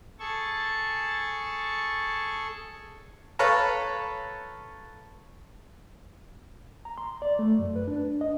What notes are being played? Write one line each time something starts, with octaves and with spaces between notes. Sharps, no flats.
G#4 A4 A5 C#6
A4 B4 C#5 F5 A5 A#5
A#5
C6
D5
A3
F#2
B4
D4
D#5